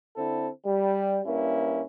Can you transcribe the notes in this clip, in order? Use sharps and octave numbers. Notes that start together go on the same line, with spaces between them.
D3 C4 E4 A4
G3
G2 A#3 C#4 E4